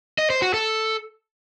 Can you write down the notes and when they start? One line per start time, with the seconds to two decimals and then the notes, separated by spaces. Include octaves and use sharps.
0.18 D#5
0.30 C5
0.42 F#4
0.54 A4